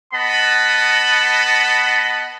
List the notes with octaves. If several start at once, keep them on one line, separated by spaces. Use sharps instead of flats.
B3 D#5 F#5 A5 B5